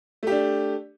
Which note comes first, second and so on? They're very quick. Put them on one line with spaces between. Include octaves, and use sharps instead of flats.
A3 G4 D4